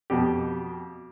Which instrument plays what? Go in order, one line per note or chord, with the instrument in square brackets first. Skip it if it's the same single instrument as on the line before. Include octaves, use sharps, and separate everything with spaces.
[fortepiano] F2 B2 G4